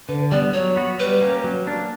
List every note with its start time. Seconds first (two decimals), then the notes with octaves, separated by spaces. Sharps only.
0.08 D3 B4
0.32 G3 B3 D5
0.54 F#3 C#5
0.76 B3 F#4
0.99 G3 B4
1.21 A#3 C#4 G4
1.44 F#3
1.67 A#3 D4